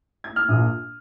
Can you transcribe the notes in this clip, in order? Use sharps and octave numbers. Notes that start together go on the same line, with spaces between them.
G#6
F6
A#1 A#2 A#3 F4 D#6